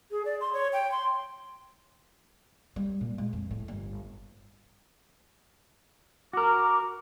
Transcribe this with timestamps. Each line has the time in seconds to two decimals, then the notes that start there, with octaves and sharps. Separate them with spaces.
0.11 G#4
0.25 D5
0.41 C6
0.53 C#5
0.73 G5
0.92 C6
2.76 G3
3.01 A#2
3.18 G#3
3.33 F2
3.51 A2
3.68 G1
6.33 F#4 A#4 D6